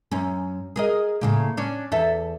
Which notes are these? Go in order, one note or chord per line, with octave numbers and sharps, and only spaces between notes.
F#2 C#4
G#4 A#4 D#5
A2 C#3 A#3
C#4 D4
E2 A4 E5